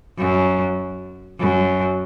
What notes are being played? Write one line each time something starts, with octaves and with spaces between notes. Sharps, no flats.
F#2
F#2